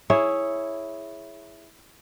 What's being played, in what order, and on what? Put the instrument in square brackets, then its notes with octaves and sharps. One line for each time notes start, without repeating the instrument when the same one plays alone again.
[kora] E4 G#4 C#5 E5